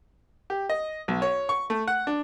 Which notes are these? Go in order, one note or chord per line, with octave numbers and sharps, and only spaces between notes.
G4
D#5
B1
C#5
C#6
A3
F#5
D4